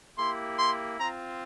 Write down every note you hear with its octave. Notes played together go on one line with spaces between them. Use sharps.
A#3 E4 G4 C6
C6
C4 F4 A#5